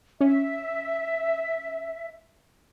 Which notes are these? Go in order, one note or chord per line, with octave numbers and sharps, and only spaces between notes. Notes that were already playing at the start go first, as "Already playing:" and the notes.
C#4 E5